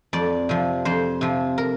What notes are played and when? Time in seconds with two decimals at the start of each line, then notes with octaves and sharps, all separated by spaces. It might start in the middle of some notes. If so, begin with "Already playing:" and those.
0.13 F2 D5
0.49 C3 F3
0.85 F2 C5
1.21 C3 F3
1.58 A#4